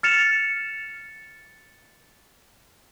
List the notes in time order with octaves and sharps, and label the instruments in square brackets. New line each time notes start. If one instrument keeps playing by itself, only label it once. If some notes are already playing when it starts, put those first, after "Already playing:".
[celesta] F6 A6 C#7 E7 F7